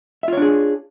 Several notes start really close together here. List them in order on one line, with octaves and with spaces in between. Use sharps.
E5 F4 C#5 D4 G#4